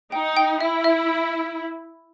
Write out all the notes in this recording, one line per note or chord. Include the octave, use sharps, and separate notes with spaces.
D#4 G5
G5
E4 E5
E5